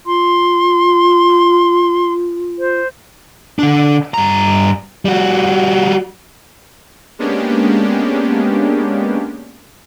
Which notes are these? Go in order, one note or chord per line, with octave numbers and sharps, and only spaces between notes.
F4 C6
C5
D3 D4
G2 A#5
G3 F#4
G#3 A#3 B3 C#4 D4 G4